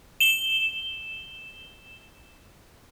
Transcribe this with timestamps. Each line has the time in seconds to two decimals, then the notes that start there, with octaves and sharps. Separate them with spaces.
0.20 E7 G7